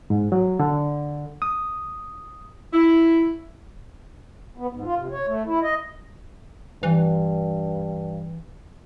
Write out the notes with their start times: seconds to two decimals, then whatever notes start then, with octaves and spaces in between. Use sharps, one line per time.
0.10 G#2
0.32 F#3
0.60 D3
1.42 D#6
2.73 E4
4.58 B3
4.72 G#2
4.85 F4
4.97 C3
5.11 C#5
5.27 A3
5.46 E4
5.62 D#5
6.83 G2 E3